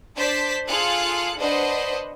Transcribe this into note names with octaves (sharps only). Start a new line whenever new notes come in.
D4 C5 D5 A5 B6
F4 G#4 A4 F5 F#6 C#7
D4 B4 C5 D#5 F#5